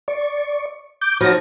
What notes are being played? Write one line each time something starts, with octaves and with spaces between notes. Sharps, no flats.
D5 C#6
D6 G6
F3 D#4 F#4 C#5 A#6